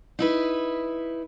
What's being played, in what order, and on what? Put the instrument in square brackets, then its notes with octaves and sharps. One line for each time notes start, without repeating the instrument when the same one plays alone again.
[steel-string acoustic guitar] D#4 E4 B4